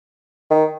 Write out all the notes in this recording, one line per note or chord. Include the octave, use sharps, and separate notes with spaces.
D#3